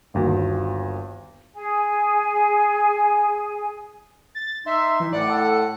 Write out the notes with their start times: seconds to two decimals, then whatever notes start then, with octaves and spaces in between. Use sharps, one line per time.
0.14 G1 D#2 F#4
1.55 G#4 G#5
4.35 A6
4.66 D#4 E5 C6
5.00 E3
5.13 A2 D5 F#5 F#6
5.30 A4